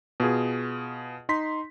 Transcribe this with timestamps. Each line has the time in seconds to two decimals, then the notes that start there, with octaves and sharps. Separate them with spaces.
0.20 B2 F4 G#4
1.29 D#4 C6 B6